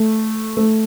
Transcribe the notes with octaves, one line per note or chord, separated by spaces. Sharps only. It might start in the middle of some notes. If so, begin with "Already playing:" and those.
Already playing: A3
A3